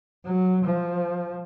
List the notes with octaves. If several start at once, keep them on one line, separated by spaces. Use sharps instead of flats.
F#3
F3